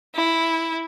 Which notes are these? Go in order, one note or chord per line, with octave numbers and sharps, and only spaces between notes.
E4